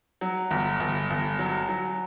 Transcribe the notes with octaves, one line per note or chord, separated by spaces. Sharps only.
F#3
G1
G1
G1
F#3
F#3